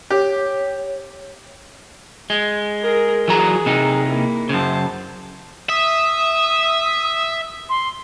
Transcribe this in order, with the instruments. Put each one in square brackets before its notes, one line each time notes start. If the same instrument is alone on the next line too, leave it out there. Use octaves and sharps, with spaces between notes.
[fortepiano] G4 [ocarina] C#5
[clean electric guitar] G#3
[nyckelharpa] G#4 A#4
[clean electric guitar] E3 F#3 A#5 [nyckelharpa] G#4
[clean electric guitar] C3 D#4
[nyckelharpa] A#3 E4
[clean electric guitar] F#2 C#3 [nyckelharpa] C5 A5
[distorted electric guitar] E5 [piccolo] D#6
[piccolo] C6